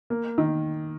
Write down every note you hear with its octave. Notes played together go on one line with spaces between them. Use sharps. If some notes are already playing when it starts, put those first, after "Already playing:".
A#3
D#3